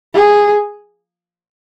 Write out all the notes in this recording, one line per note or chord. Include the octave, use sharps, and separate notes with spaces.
G#4